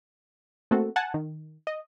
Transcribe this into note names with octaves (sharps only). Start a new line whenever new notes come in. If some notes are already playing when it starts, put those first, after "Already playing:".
A3 A#3 C4 F#4 A4
F#5 G#5 A5
D#3
D#5